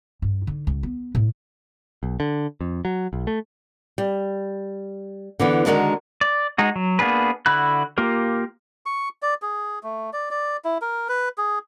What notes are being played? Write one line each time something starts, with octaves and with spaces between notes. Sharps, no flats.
G2
D3 D#4
C#2
B3
A2
B1
D3
F2
F#3
B1
A3
G3
D3 E3 B3
D3 D#3 G#3 D4 F#4 A#4
D5
G#3 D#4 F#4
F#3
A#3 B3 D4 G#4 B4
D3 E4 F#4 B5 F#6
A#3 F4 G4 A#4
C#6
D5
G#4
A3
D5
D5
E4
A#4
B4
G#4